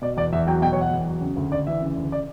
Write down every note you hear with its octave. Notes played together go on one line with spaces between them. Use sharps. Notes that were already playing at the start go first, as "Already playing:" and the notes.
B2 D5
E2 D5
E2 E5
F#3 G5
B2 G5
C#5
E2 F#5
E2
F#3
C#3
D2
D2 D5
E3 E5
C#3
D2
D5